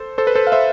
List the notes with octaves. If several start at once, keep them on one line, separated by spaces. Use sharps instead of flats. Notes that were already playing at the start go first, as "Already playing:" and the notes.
Already playing: A4 C5
A4 C5
B4
A4 C5
F5
C5 E5